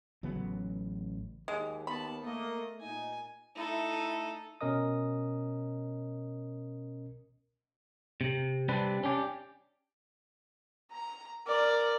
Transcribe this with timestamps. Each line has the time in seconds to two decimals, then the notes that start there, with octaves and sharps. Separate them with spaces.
0.23 A1 C#3 F#3 B3
1.48 D#2 G#3
1.87 B3 A5 B5
2.22 A3 A#3 D#5
2.81 A#2 D#4 G#5
3.56 A3 D#4 E4 A4
4.61 B2 C#4 A#4 D#5 D#6
8.21 C3
8.69 C3 G3 C4 D4 B4
9.03 C#4 D4 G4
10.92 A#5
11.47 A#4 D5